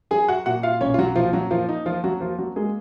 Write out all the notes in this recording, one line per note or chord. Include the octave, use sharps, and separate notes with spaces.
F#3 G#4 G#5
F#4 F#5
A#2 F#4 F#5
F4 F5
B1 C#4 C#5
F4
F#3 F#4
A#2 F3 F4
F#3 F#4
F3 A#3 F4
D#4
F3 A#3 F4
F#3 F#4
F3 A#3 F4
F#3 F#4
G#3 A#3 G#4